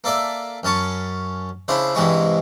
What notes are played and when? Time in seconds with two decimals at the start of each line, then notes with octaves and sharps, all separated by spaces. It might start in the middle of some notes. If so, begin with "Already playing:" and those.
0.04 A#3 A4 D5 E5
0.63 F#2 C#4 A5 C#6
1.68 C#3 D4 E4 C5
1.95 G2 C3 E3 G#3 F#4